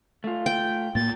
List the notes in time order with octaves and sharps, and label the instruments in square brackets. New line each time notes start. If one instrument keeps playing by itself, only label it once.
[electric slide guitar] A3 F4
[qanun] G5
[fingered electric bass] A2 A#3 [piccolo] A6